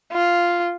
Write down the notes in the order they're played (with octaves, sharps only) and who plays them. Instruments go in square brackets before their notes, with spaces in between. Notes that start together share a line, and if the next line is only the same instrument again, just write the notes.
[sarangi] F4